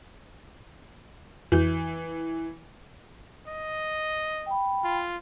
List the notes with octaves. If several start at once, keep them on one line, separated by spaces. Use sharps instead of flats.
F2 E3 F#4 G6
D#5
G5 B5
F4